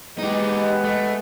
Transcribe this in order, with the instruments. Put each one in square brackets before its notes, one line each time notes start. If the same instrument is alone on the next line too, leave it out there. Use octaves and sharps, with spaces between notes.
[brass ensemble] G#3 B3 [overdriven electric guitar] D#4 G4
[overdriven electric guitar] A3